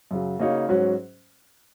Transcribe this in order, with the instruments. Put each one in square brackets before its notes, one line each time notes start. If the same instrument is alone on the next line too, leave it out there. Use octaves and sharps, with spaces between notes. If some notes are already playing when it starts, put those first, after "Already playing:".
[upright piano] F#2 C#3 F#3
C#3 A#3 D#4 F#4 C#5
G#2 F#3 C#4 F#4